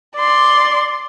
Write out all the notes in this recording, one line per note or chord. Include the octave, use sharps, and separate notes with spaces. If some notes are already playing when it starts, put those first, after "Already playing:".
D5 C6